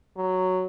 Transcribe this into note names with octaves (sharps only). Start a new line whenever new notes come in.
F#3